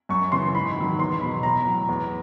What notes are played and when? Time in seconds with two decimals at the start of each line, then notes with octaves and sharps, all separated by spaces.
0.09 F#2 C#6
0.32 C#3 E3 C6
0.54 G#2 B5
0.76 D#3 F#3
0.99 E2 C6
1.21 B2 B5
1.25 F#3
1.43 A2 A#5
1.66 F#3
1.89 E2